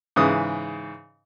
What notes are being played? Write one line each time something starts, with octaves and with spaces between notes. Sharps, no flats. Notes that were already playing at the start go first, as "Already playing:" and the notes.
G#2 C#3 E3 D#6